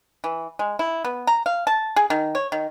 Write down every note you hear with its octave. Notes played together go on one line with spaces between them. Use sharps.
E3
G#3
E4
B3
A#5
F5
A5
G#4
D#3
C#5
D#3